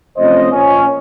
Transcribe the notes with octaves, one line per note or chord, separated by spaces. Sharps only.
C3 F3 A3 C#4 C5 D#5
A#2 F3 A#3 C#4